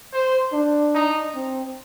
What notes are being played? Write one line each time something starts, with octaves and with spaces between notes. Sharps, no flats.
C5
D4
D#4
C4